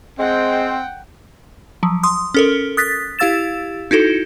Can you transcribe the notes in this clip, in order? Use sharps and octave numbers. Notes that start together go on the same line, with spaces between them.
G#3 C4 F#5 G5
F3 F#3
C6 D#6
C#4 A4 A#4
D#6 F#6 A6 B6
E4 G4 F5 E6 A6 E7
D#4 E4 F#4 A4